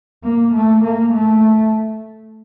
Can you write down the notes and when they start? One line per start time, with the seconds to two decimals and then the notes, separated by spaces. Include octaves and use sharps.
0.24 A#3
0.54 A3
0.83 A#3
1.13 A3